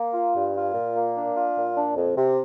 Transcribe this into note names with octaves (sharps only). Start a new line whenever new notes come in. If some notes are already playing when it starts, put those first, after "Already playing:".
Already playing: A#3
F4
G2
F4
A#2
A#3
D4
F4
A#2
D4
F2
C3